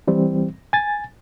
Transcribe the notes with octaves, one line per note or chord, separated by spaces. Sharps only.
E3 G3 C4
G#5 A6